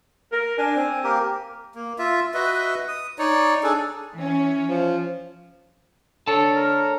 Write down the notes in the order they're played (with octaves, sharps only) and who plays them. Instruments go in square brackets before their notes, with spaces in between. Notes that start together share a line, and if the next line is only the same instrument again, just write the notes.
[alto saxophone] A#4
[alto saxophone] D4 [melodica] G#5
[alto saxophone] C4
[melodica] A#3 G4 A#4
A#3
F4 E5
F#4 B4 D#5 E5
D#6
D#4 C#5 D5
D4 G#4 A4
[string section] E3 C#4
[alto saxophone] F3
[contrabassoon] D3 [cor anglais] A4 [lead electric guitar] C#5 A5
[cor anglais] A#4